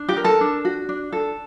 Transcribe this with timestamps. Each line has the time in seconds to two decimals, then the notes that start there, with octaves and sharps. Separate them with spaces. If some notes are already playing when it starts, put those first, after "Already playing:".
Already playing: D4
0.09 G4 G5
0.17 A#4
0.24 A4 A5
0.41 D4
0.65 F#4
0.89 D4
1.13 A4